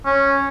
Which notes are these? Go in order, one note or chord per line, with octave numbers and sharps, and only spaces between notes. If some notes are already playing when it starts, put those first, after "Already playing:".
C#4